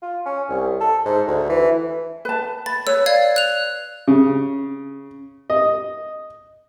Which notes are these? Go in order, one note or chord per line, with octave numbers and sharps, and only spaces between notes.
F4
C#4
C2
A4
G#2
D2
E3
B4 A5
B5 A6
B4 C#5 E6
D5 F5 G#6
F#6 F7
C#3
D#5